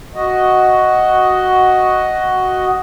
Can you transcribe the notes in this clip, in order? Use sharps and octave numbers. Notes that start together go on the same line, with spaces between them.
F#4 D#5